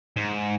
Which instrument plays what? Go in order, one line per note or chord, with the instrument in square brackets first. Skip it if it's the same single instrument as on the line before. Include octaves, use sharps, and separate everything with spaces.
[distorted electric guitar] G#2